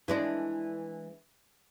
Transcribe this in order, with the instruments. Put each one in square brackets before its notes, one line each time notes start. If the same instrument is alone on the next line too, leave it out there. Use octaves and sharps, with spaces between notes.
[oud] E3 G#3 D4